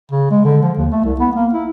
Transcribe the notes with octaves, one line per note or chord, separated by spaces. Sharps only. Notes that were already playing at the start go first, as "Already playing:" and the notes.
C#3
G#3
D3
F3
D#2
A3
C2
B3
A#3
E4